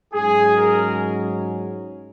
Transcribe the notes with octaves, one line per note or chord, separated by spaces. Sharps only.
G#2 F#3 C#4 G#4
A#4